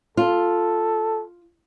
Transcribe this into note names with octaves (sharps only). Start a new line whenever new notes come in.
F4 A4